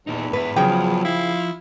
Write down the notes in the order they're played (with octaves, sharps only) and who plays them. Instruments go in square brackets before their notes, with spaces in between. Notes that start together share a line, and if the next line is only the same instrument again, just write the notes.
[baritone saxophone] E2 [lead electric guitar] A#2 D#4
[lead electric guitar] G#2 E5 [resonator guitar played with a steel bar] B4
[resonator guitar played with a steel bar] C#3 G#4 G5 [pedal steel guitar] F3 [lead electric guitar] F#3
[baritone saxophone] E4 [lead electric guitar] F5